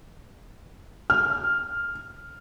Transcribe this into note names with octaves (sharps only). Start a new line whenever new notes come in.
F6